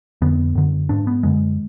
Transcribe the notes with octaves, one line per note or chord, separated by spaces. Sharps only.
F2 D3 B3
F#2 D3
G#2 D4
B3
F#2 D3 G#3